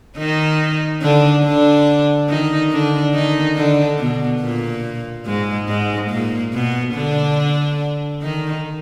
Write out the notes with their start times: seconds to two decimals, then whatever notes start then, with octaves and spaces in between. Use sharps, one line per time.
0.17 D#3 D#4
1.02 D3 D4
1.44 D3 D4
2.28 D#3 D#4
2.71 D3 D4
3.13 D#3 D#4
3.55 D3 D4
3.98 B2 B3
4.40 A#2 A#3
5.26 G#2 G#3
5.68 G#2 G#3
6.10 A#2 A#3
6.53 B2 B3
6.95 D3 D4
8.22 D#3 D#4